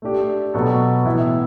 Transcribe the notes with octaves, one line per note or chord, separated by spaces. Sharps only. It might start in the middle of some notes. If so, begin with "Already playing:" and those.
A3 D4 G4
B2 F#3 B3 F#4 A4
A2 E3 B3 E4